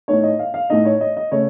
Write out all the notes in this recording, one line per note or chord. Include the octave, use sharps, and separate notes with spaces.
A2 A3 D#4 C#5
D#5
F5
F5
A2 A3 D#4 D#5
C#5
D#5
D#5
C#3 A3 C#5